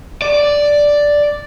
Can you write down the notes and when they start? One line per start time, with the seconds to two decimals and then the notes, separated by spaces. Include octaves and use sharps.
0.22 D5